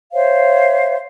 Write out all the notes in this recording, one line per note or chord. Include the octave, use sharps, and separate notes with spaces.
C5 C#5 E5 F5